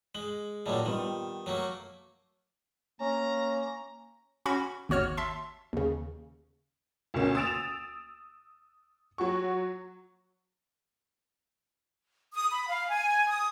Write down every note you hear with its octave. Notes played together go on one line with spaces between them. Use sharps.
G#3 F#7
A#2 D3 F#3 G3 D#5 A5
D#3 G3 B3 F4
F#3 A3 A#3
A#3 C#4 A#5
C#4 F#4 B5 C#6
G#1 D#2 F#4 C#5 F6
E5 A5 C6
D#2 C#3
D2 B2 A#3 C#4
D#6 E6 A6 D7 E7 F7
F#3 F#4 C#6
D#6
B5
F5
G#5
D#6